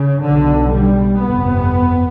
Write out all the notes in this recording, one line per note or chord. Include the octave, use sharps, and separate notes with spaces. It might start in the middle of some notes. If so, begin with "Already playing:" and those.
Already playing: C#3
B1 B2 D3
G3
G1 F2 C3 B3